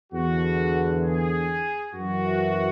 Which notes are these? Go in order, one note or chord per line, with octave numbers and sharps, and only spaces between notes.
E2 D3 F#4
G#4
F#2 E3 F#4